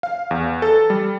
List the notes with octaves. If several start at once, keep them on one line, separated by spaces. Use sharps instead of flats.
F5
E2
A4
G3